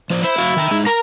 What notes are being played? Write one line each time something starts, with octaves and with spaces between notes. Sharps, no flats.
F3 C5 D5
E4 C5
F#3 F#4 F5
D#3 G5 A#5
G#3 D#4 G#4
A#4 A#5